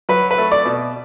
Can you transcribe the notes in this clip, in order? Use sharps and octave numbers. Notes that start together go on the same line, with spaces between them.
F#3 B4
B4
A3
D5
B2